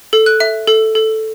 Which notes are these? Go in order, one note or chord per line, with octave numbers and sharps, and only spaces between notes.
A4
F#6
E5
A4
A4